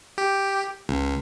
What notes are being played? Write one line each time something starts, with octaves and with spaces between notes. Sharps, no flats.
G4
C#2